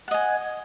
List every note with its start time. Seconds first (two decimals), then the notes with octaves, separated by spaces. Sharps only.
0.08 F#5
0.11 D#5
0.14 G#5